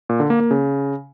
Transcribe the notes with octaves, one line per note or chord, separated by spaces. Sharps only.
A#2
D3
A#3
A#3
C#3